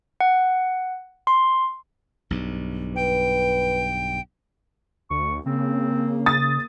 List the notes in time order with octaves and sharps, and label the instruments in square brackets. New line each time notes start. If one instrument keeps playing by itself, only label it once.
[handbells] F#5
C6
[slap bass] B1 G2
[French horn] B4 [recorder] G5
[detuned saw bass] D2 [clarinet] C#6
[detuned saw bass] C#3 [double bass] A#3 [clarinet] C4
[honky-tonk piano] D#6 A6